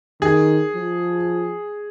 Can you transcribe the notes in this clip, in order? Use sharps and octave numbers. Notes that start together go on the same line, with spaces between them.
D#3 G#4
F3